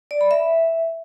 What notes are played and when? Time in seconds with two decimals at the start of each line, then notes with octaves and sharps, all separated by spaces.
0.11 D5
0.21 B5
0.31 E5